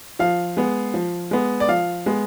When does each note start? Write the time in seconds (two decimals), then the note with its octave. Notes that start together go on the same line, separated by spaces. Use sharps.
0.19 F3 F5
0.57 G#3 B3
0.94 F3
1.31 G#3 B3
1.60 D5
1.68 F3 F5
2.06 G#3 B3